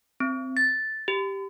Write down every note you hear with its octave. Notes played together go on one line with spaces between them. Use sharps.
C4
A6
G4